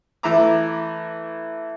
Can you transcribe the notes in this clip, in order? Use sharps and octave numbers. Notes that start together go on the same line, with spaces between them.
E3 A3 E4 E5 A#5 D6